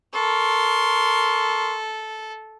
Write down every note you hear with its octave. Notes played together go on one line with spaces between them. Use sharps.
A4 A#4 C6 C#6